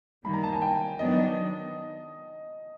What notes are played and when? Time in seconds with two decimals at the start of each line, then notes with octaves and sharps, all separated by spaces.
0.24 D#3 G3 A#3 B5
0.33 A#5
0.44 A5
0.53 G#5
0.62 G5
0.99 D#3 F#3 B3 D4 D#5